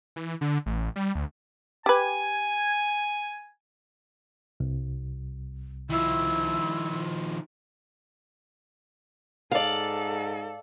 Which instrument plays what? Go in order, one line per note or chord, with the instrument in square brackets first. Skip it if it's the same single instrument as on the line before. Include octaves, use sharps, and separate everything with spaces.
[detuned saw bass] E3
D3
A1
G3
D2
[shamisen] G4 B4 [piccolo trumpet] G#5
[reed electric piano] C2
[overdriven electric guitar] D#3 F3 [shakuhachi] E4
[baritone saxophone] G#2 [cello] A4 [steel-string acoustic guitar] D5 F5